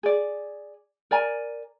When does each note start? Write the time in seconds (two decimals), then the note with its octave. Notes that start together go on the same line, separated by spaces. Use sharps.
0.03 G#4 D5
1.11 A#4 D5 G#5 A#5